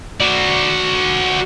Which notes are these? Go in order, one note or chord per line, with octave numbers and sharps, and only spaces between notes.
F#4 D5